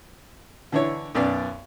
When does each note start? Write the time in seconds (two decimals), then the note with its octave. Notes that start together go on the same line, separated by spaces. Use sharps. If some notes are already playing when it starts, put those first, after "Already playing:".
0.72 D3 E3 D4 E4 C#5
1.15 B1 F#2 B3 D5